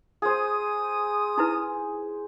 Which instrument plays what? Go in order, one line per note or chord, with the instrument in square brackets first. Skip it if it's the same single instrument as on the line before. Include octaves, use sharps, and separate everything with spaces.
[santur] G#4 C5 [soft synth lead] D#6
[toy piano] D#4 E4 B4